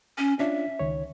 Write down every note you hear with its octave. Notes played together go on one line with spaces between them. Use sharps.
C#4
C#4 D4 F4 E5
C#2 D#3 C#5